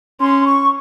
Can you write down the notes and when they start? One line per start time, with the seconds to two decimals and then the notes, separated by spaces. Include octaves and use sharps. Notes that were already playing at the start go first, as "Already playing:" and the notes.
0.21 C#4 C6
0.45 C#6